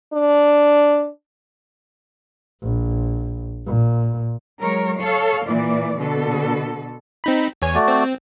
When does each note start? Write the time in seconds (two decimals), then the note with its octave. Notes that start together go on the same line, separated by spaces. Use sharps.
0.13 D4
2.63 A#1
3.66 A#2
4.61 F#3 G#3 A#4 C#5
4.99 A4 C#5 F5
5.46 A#2 E3 D5
5.97 B2 D3 A4
7.24 C4 D#4 B5
7.62 E2 C#5 G#5
7.75 A3 F#4 D5
7.88 C4